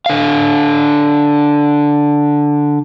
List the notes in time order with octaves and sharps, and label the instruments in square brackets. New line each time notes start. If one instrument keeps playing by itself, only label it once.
[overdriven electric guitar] D3 F5